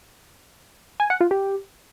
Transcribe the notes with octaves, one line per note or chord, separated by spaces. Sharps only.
G#5
F#5
F4
G4